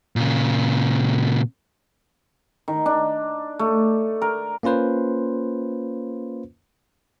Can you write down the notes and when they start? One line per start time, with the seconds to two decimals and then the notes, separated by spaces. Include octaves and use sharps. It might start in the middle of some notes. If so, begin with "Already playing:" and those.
0.16 A#2 C#3
2.68 D#3
2.86 D4
3.59 A3
4.22 A#4
4.63 A#3 C#4 F4 B4 C5